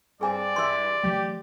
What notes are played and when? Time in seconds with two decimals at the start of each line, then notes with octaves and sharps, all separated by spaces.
0.21 G2 C4 G#4 D5 G#5
0.56 G2 E3 C6 E6
1.03 E3 F#3 A3 G4